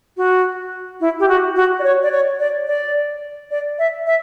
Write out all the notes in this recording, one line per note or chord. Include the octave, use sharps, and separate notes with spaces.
F#4
E4
G4
F#4
F#4
D5
C#5
D5
C#5
D5
D5
D5
E5
E5